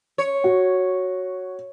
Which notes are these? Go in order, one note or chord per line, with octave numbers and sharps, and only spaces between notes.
C#5
F#4